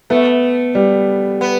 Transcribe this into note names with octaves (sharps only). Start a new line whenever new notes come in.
A3 B3
G3
B3